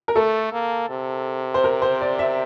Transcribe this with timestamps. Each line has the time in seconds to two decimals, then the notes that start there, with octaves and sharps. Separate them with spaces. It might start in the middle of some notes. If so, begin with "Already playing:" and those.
0.08 A#4
0.15 A3 A4
0.53 A#3
0.89 C3
1.54 C5
1.64 A#4
1.82 C5
2.01 D5
2.19 E5